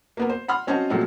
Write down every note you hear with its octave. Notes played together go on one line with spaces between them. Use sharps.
A#3 B3 A#4
C5
F#5 B5 C6 F6
C4 C#4 F#4 C5 D#5 A5
A#2 F3 F#3 G#3 A3 C4